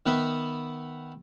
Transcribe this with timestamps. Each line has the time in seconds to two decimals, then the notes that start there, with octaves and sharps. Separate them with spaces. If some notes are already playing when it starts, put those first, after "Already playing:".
0.06 D#3 B3 B4 E5